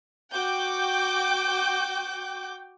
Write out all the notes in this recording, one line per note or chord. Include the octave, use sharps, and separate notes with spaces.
F#4 G5 D6 G6